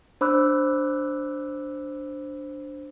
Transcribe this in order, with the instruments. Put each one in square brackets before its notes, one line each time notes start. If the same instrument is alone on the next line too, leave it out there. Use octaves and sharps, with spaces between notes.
[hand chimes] D4 C5 B5 D6 E6 F#6